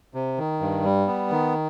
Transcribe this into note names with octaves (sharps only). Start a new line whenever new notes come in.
C3
D#3
G2
G3
B3
D#3